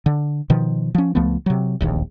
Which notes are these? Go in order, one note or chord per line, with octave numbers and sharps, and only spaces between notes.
D3
B2 D#3 F3
F3 C#4
C#2 F3 A3 B3
C3 F#3
D1 A#1 D#2